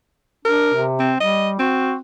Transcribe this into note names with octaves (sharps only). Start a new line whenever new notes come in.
D4 A#4
C3
C4
G3 D#5
C4 F#4